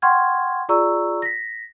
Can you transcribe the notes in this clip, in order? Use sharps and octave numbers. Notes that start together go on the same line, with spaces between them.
F#5 G5 C6 C#6 F6 G#6
F4 G#4 D5 A#5 C#6 E6
A#6 B6